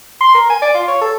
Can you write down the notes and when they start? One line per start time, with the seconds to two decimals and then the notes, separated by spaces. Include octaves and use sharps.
0.21 C6
0.34 A#4
0.50 G#5
0.62 D5
0.74 F4
0.88 C#5
1.01 A4